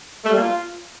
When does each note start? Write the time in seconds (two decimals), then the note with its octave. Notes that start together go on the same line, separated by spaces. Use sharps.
0.24 A3
0.29 G3
0.35 A#3
0.41 F4